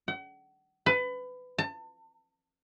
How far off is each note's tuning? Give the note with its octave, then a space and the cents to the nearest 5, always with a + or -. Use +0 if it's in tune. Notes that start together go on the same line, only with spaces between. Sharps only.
F#5 +40
B4 +25
A5 +35